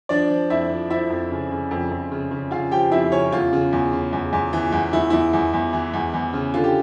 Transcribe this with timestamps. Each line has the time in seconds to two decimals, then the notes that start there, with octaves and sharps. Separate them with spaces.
0.09 F3 D4 D5
0.30 F3
0.50 F2 E4 E5
0.71 F3
0.90 F3 E4 E5
1.10 F2
1.31 C#3
1.51 C#3
1.71 F2
1.91 F2
2.11 C#3
2.31 C#3
2.51 C#3 F4 F5
2.71 F3 G4 G5
2.91 F2 E4 E5
3.12 C#3 C#4 C#5
3.32 E2 F4
3.53 C#3
3.73 E2
3.93 C#3
4.13 E2
4.33 E2
4.53 E3
4.72 E2
4.93 E2 E4
5.10 E2 E4
5.33 E2
5.53 E2
5.73 E3
5.93 E2
6.14 E2
6.33 C#3
6.54 D3 F4
6.64 G4